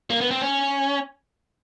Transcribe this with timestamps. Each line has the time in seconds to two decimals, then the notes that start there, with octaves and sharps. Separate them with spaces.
0.10 A#3
0.21 B3
0.31 C4
0.42 C#4